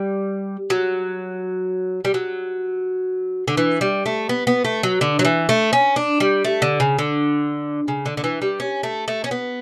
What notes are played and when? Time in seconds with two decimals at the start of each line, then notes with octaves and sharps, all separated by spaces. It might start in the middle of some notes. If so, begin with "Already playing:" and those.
Already playing: G3
0.70 F#3
2.05 G3
2.14 F#3
3.48 D3
3.57 E3
3.81 G3
4.06 A3
4.29 B3
4.47 B3
4.65 A3
4.83 F#3
5.01 D3
5.19 F#3
5.25 E3
5.49 A3
5.73 C#4
5.96 D4
6.20 G3
6.44 A3
6.62 D3
6.80 C#3
6.99 D3
7.88 C#3
8.06 D3
8.17 D3
8.24 E3
8.42 G3
8.60 C#4
8.83 A3
9.08 A3
9.24 C#4
9.31 B3